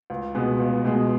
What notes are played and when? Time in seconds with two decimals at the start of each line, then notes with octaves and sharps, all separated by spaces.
0.10 C#2
0.35 B2 G#3 B3
0.60 C#2
0.85 B2 G#3 B3